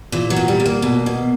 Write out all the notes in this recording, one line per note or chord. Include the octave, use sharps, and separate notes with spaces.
A#2 E3
F#3
A#2
G3
A#2
A#3
B2
B2